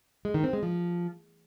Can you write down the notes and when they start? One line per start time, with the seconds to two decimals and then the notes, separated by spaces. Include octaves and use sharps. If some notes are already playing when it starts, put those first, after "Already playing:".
0.25 G#3
0.34 D#3
0.44 C4
0.53 G#3
0.63 F3